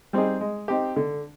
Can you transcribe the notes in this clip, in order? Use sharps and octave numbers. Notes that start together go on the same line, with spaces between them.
G3 C4 D#4 G#4
G#3
C4 D#4 G4
D3